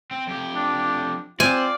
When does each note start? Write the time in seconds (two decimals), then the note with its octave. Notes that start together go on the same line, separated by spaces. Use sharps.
0.11 C4
0.27 F2 G4
0.55 D4
1.40 C4 F4 D5 G#5